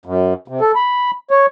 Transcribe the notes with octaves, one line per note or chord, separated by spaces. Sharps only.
F#2
C3
A4
B5
C#5